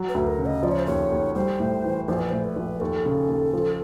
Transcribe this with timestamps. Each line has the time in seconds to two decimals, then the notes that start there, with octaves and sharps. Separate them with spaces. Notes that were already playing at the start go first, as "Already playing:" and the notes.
Already playing: F#3
0.09 B4
0.15 D2
0.27 A#4
0.39 C#3
0.46 D#5
0.63 F3 D5
0.71 C#5
0.79 C5
0.86 D#2 C#5
1.12 D#2
1.35 G3 C5
1.60 A2
1.85 E3
2.08 A#1 C5
2.19 B4
2.29 A2 C5
2.44 B4
2.56 A#1
2.80 D#2 A4
3.05 C#3
3.29 D#2
3.53 F3